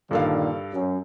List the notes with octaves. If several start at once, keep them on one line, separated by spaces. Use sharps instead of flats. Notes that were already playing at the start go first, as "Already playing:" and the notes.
G2 A#2 D3 D#3 A4 F5
F#2